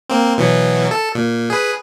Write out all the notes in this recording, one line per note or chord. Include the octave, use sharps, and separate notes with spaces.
A#3 C4
B2 E3 F#3
A4
A#2
G#4 B4